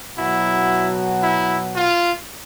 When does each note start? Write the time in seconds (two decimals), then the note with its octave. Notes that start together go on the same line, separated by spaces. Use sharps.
0.17 B2 F#3 E4
1.22 E4
1.74 F4